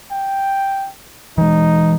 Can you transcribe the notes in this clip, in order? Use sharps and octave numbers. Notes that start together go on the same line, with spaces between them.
G5
E3 G#3 D#4